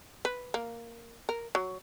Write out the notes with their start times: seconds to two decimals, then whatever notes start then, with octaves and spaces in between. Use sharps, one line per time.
0.25 B4
0.54 A#3
1.29 A#4
1.55 F#3